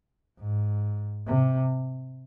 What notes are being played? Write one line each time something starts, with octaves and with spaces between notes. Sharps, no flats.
G#2
C3